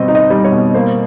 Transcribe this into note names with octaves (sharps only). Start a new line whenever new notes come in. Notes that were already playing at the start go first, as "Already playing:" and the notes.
Already playing: B2 G3 C4 D#5
D#4
D#5
G3
C#5
B2
A#3 C5